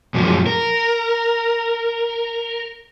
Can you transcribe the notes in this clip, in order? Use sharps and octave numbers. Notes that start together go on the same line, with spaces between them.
F#2 A#2 F3 F#3 G#3
A#4